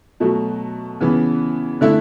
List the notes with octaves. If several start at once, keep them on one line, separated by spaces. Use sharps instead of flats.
B2 F#3 A3
C#3 E3 B3
D3 A3 E4